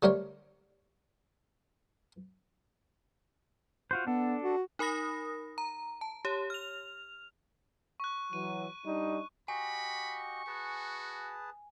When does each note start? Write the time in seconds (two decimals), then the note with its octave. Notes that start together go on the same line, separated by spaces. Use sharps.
0.03 D3 G3 A3 A#4 C5 C#5
3.91 F4 F#4 C5
4.07 B3 D4 A4
4.44 F#4
4.79 D#4 A#4 B5 D#6 A#6
5.58 A#5
6.01 A5
6.25 G4 C#5
6.50 F6 F7
8.00 C#6 F#6
8.33 E3 F#3 D#7
8.86 G3 D4 D#4
9.48 F#4 G4 D#5 G#5 B5 C#6
10.47 F#4 G#4 B4 A5